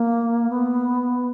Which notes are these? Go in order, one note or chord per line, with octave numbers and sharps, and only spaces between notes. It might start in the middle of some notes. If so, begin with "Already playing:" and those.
Already playing: A#3
B3